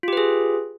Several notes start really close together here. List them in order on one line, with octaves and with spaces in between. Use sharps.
F4 G4 B4 G#4